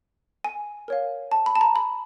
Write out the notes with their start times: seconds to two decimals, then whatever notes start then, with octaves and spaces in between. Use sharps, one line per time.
0.44 G#5
0.88 A#4 C#5 F5
1.32 A5
1.46 B5
1.56 A5
1.61 A#5
1.76 B5